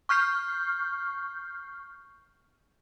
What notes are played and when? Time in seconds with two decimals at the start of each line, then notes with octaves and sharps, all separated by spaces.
0.09 C#6 F6 G6 C7